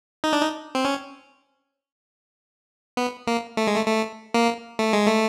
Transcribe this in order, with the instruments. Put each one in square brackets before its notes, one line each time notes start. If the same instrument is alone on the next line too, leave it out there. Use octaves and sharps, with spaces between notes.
[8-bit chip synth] D#4
D4
D#4
C4
C#4
B3
A#3
A3
G#3
A3
A3
A#3
A3
G#3
A3